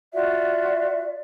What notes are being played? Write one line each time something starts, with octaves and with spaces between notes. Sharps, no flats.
F4 F#4 D5 E5